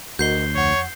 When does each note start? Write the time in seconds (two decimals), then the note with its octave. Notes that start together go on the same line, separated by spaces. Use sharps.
0.19 D2 F#4 A#4 D#5 G6 C7 G7
0.55 F2 C#5 F#5